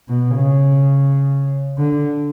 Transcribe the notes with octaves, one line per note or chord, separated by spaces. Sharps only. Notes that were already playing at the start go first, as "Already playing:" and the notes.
B2
C#3
D3